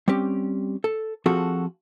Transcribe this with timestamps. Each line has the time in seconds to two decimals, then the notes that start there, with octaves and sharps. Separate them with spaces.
0.08 G3 C4 C#4 G4
0.84 A4
1.26 F3 C4 F4 F#4 G#4 A4